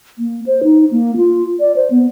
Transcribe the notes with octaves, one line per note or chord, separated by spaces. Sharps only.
A#3
C5
D#4
A#3
F4
D5
C5
B3